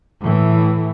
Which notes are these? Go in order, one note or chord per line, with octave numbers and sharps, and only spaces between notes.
A2 E3